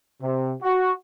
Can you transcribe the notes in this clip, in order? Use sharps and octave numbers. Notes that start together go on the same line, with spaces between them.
C3
F#4